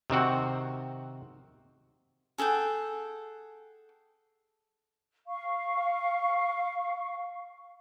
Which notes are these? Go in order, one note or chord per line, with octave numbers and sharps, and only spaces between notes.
C3 D#3 C4 F#4
G#4 A4 F#5 G5
F5 C#6